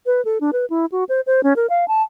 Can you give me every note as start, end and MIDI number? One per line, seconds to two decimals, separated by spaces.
0.06 0.24 71
0.25 0.38 69
0.41 0.51 62
0.53 0.65 71
0.70 0.86 64
0.92 1.04 66
1.09 1.21 72
1.27 1.43 72
1.43 1.53 61
1.56 1.67 70
1.70 1.87 77
1.88 2.02 81